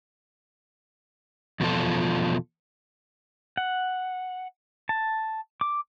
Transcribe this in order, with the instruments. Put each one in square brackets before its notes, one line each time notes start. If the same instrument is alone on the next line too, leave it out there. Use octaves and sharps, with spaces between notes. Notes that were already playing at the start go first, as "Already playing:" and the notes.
[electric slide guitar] E2 B2 F3 F4 A4
[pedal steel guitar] F#5
A5
D6